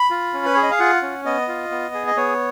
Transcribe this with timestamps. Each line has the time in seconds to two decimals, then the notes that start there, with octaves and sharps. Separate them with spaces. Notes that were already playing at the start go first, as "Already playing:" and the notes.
Already playing: B5
0.11 F4
0.34 C#4
0.46 B4
0.54 G#4 C#5
0.63 D#5
0.71 F5
0.80 F4 F#5
1.02 C#4
1.25 B3 D#5
1.48 F4
1.71 B3
1.94 G#4
2.07 D#5
2.17 B3 C#5